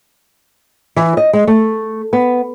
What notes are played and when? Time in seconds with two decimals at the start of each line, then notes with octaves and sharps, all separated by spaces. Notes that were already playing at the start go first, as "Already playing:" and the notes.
0.96 E3
1.17 D#5
1.33 G#3
1.47 A3
2.13 B3